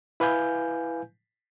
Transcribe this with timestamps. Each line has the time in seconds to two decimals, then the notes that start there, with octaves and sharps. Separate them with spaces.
0.20 E4 B4 F5 G#5 G6